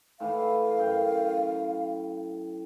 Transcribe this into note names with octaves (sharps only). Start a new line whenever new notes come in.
A2 E3 F5
F#2 G5